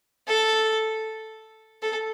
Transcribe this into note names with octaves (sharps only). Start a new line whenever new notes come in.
A4
A4